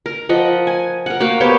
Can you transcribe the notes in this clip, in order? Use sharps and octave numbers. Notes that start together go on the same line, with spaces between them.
A#4
F3 D#5 F#5
G#5
A#4 F#5
A#3 F#4 F5
B3 G4 C5 C#5